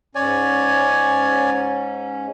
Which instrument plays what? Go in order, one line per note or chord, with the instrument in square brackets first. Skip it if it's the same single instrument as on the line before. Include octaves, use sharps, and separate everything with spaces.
[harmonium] G#2 C#4 [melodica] C#5 D5 G#5